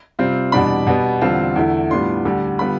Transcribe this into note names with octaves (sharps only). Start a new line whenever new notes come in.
C3 G3 C4 F4
E2 B2 G3 D4 B5
B2 G3 B3
E2 D3 G3 C4 F4 A5
E2 D3 A3 E4
A2 G3 B3 D4 F4 C6
D2 D3 G3
D3 G3 B3 F4 B5